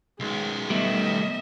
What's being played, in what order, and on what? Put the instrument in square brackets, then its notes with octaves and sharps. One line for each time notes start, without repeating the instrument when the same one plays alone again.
[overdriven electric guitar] B1 D#3 [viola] G#3
[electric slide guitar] G3 A3 B3 [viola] D#5 E5